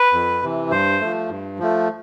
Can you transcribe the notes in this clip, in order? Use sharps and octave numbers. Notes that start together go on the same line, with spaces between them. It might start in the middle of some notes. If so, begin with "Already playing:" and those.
Already playing: B4
F2
C3 E3
G2 C5
F3 A3
G2
F3 A3